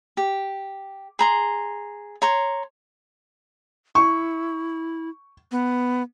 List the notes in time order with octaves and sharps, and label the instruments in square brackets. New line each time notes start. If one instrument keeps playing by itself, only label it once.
[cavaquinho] G4
G#4 A#5 C6
C#5 A#5 C6
[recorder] E4 [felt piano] C#6
[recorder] B3